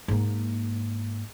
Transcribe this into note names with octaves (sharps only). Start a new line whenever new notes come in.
G#2 A#3